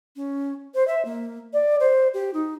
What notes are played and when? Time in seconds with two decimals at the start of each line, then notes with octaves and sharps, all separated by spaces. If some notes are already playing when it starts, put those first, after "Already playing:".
0.16 C#4
0.75 C5
0.88 E5
1.05 A#3
1.53 D5
1.80 C5
2.14 G4
2.34 D#4